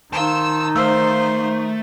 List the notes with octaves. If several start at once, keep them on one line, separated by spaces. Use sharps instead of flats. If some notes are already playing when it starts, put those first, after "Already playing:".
D#3 D#4 F4 C5 A5 E6
A3 C5 F5 E6